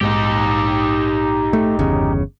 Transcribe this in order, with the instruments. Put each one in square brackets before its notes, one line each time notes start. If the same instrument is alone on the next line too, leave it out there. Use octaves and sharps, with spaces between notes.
[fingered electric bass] A#1 G#2 G#3 [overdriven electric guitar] D#4 G4
[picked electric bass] A3
G1 E2 C#3